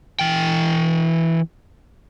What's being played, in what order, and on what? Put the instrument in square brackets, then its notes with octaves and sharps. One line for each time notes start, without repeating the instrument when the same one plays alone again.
[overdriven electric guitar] E3 G5